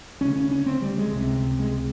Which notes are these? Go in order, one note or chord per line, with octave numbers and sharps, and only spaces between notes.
D2 C#3 C#4
C#4
C#4
C4
G3
G#3
C#2 C3
G#3